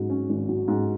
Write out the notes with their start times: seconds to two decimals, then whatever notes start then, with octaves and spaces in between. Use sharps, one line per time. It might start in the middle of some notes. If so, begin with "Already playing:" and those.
Already playing: G#2 F#3
0.09 C#4
0.29 G#1
0.49 F#3
0.68 G#2